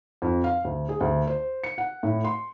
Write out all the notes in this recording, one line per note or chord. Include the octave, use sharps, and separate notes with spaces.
F2
F5
D2
G#4
D2
C5
C#7
F#5
A2
C6